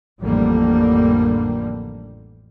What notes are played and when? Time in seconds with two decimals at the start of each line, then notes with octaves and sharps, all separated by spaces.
0.22 A1 F2 D3 G3 A#3